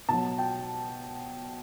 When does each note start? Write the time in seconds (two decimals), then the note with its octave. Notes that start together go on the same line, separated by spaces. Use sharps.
0.09 B2 A5
0.13 F#3
0.39 G5